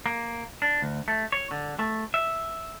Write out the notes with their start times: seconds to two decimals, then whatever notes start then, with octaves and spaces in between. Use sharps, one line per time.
0.06 A#3
0.62 D4
0.82 D2
1.08 A3
1.32 C#5
1.51 D3
1.79 A3
2.14 E5